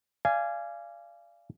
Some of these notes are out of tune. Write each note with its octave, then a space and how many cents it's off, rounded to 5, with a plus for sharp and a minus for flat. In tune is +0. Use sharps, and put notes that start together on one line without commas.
D5 +0 F5 -25 G#5 +0